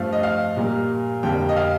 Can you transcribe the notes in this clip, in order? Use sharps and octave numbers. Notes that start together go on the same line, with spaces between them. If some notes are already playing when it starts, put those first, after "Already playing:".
Already playing: G2 F3 A3 F5
D#5
F5
A#2 G3 A#3
F2 D3 G3 A#3 G5
D#5
F5